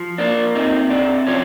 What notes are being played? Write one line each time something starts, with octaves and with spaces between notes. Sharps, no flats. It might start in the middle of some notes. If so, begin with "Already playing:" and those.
Already playing: F3
A#3 D4
C3 D#4
C3 D4
F3 C#4